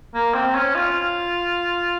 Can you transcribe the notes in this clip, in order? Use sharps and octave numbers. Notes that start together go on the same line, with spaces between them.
A#3
C4
C#4
F4